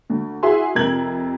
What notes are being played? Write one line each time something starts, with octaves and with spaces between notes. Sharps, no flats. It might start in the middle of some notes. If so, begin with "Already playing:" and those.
D2
E4 F#4 G#4 E5 G#5 C6
F2 C3 A#4 G#6 F#7